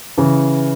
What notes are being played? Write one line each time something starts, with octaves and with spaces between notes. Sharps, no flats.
C#3 E3